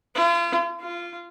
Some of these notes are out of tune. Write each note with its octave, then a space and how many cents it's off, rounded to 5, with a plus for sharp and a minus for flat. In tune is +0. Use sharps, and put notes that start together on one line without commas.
F4 -40
F4 -15